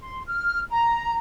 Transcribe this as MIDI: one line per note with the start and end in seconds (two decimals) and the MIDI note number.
0.01 0.21 84
0.28 0.59 89
0.70 1.18 82